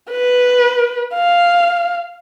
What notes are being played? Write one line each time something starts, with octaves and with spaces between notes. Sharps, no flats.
B4
F5